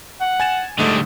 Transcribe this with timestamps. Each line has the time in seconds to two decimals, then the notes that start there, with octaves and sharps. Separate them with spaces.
0.21 F#5
0.40 G#5 A6 E7
0.79 A#1 G#2 D3 G3 A3 D#5